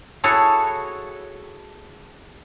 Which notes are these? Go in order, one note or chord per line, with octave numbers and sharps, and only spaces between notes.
E4 F#4 G#4 A4 C#5 E5